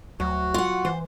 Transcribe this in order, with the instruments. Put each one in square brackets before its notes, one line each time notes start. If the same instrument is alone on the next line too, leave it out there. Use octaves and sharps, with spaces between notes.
[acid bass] D2 [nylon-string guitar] F#3 [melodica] F#4
[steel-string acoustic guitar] F4 F#5
[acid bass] E3 [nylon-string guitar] C5